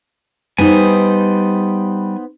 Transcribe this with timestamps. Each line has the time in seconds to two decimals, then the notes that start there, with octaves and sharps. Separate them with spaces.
0.58 G3 B3 D#4 C5 G#5